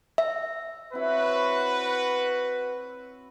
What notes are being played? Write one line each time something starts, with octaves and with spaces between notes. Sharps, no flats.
E5
C4 E4 F#4 B4 C#5